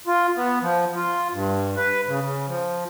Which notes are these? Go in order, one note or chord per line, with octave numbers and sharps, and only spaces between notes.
F4
B3
F3
F4
G2
B4
C#3
C#3
F3